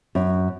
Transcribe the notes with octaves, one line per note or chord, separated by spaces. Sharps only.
F#2